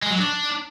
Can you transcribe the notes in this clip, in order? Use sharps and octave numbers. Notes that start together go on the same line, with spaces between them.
G#3
F#3
D4